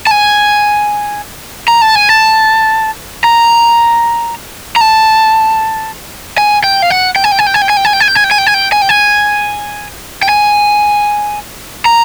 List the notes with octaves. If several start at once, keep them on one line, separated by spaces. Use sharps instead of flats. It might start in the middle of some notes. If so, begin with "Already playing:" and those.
A5
G#5
A#5
A5
G#5
A5
A#5
A#5
A5
G#5
G5
F5
F#5
G5
G#5
G5
G#5
G5
G#5
G5
G#5
G5
G#5
G5
G#5
G5
G#5
G5
G#5
G5
G#5
G5
G#5
G5
G#5
G5
G#5
A#5